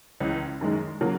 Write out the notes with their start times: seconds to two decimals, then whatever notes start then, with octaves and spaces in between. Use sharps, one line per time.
0.20 C#2 C#3 E3
0.61 F#2 D#3 G#3
1.01 C#3 F#3 A#3